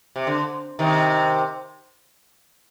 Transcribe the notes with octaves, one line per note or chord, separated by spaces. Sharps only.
C3
D3
C3 D#3